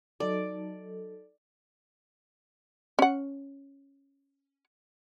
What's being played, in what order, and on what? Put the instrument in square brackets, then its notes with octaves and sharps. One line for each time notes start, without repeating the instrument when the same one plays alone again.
[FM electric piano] F#3 D#4 A4 [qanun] D5
[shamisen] C#4 F#5